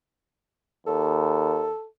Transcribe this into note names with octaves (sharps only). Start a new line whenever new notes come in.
D#2 A4